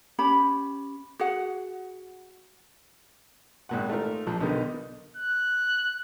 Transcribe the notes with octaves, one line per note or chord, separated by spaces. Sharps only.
C#4 G4 B5
F#4 G#4 F#5
G#1 A#2 F#5
A3 D#4 F4 A#4
A#1 F3
B1 B2 D3 D#3
F#6